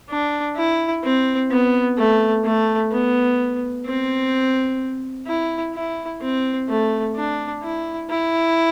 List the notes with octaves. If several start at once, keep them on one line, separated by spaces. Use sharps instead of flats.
D4
E4
C4
B3
A3
A3
B3
C4
E4
E4
C4
A3
D4
E4
E4